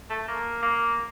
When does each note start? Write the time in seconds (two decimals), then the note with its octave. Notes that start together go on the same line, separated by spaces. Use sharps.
0.10 A3
0.28 A#3
0.63 A#3